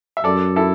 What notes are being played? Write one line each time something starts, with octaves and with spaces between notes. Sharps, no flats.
E5
F#2 A4 D5
E4 A4